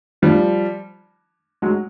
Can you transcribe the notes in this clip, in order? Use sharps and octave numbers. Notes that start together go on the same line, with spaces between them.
F3 G3
F#3 G#3